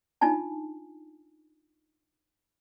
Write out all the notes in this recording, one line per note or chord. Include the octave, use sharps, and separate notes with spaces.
D4 D#4 F4 G#5 A5